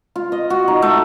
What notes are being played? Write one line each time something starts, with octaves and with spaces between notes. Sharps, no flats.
F4
D#5
F#4
D#4
A3